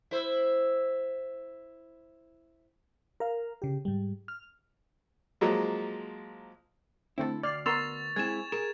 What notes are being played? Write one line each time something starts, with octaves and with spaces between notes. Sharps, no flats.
E4 C5
A#4 F5
C#3 G4
G#2 G3
F6
F3 F#3 G#3 A#3
D3 A3 C4 E4 A4
D2 D5 F6 C7
B3 A#4 C6 C#6 E6 A6 F7
G#3 C4 E4 G#5 G#6 E7
G#4 A#4 E7